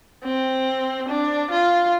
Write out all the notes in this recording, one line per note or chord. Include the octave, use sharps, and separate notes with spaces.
C4
D4
F4